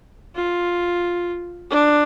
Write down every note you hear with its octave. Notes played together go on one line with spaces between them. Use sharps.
F4
D4